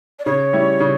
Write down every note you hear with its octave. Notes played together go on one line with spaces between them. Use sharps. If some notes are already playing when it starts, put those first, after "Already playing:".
D5
C#3 C#5
G3 C#4 E4
C#3